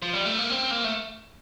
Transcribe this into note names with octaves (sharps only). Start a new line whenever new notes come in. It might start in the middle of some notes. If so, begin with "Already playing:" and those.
F3
G3
A3
A#3
C4
A#3
A3